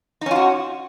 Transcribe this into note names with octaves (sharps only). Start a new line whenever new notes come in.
C#4 D#4 F4 F#4